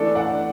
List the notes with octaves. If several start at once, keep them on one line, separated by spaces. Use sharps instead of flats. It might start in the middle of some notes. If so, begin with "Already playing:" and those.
Already playing: E3 A3 D4 A4 D5
D5 F#5